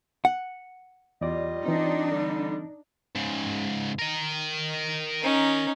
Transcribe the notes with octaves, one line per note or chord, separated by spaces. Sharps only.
F#5
E2 G3 F4 D5 D#5
E3 C4 D4 D#4
D3 G3
G#2 C#3
A#4 D#5
C#4 D#4